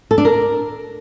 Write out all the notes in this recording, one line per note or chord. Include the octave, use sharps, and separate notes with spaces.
A4
D4
A#4